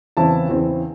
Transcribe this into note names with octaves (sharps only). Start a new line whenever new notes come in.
E2 C#3 E3 C4 E4 A5
E2 C#3 E3 C4 E4